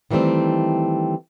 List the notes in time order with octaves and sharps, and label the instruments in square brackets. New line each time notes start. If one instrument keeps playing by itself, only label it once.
[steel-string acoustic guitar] D#3 E3 G3 A3 C4